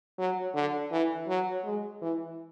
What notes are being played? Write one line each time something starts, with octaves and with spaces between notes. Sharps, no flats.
F#3
D3
E3
F#3
G#3
E3